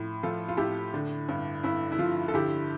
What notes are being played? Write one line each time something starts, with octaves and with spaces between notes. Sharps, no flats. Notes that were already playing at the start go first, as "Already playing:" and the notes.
Already playing: A2 F3
F3 F4 A4
F4
A2 E4 G4
D3
G2
G2 E4
E4
F3 F4
A4
D3 E4 G4